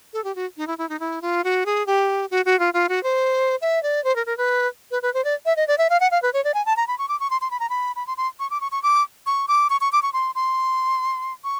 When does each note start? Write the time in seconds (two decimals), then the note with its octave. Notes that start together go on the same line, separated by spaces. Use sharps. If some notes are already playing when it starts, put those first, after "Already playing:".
0.13 A4
0.24 G4
0.36 F#4
0.57 D#4
0.67 E4
0.78 E4
0.89 D#4
1.00 E4
1.22 F4
1.44 F#4
1.66 G#4
1.87 G4
2.31 F#4
2.45 F#4
2.59 F4
2.74 F4
2.89 F#4
3.03 C5
3.62 E5
3.83 D5
4.04 C5
4.16 A#4
4.26 A#4
4.37 B4
4.91 B4
5.02 B4
5.14 C5
5.25 D5
5.46 E5
5.57 D#5
5.68 D5
5.78 E5
5.90 F5
6.00 F#5
6.11 F5
6.22 B4
6.33 C#5
6.44 D5
6.54 G#5
6.66 A5
6.77 A#5
6.88 B5
6.98 C#6
7.09 D6
7.20 C#6
7.30 C6
7.41 C6
7.51 B5
7.60 A#5
7.70 B5
7.96 B5
8.07 C6
8.17 C6
8.40 C#6
8.51 D6
8.61 C#6
8.72 C#6
8.83 D6
9.26 C#6
9.48 D6
9.70 C#6
9.81 C#6
9.92 D6
10.03 C#6
10.13 C6
10.35 C6
11.44 C#6